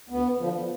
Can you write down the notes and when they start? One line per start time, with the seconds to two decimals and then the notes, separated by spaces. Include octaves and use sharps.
0.09 D2 B3
0.39 D3 F3